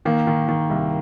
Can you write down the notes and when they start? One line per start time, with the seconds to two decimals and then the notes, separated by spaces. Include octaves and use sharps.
0.05 D#3 A#3
0.27 D#3
0.48 D#3
0.70 C2